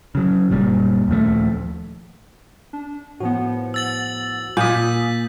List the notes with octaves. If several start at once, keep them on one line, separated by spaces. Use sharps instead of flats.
C#3 F#3
F#1 A#2 G3
D#2 A#2 F3 A3
D4
A2 F3 B3 F#4
E6 A6 F#7
A#2 G#5 D#6 G6 B6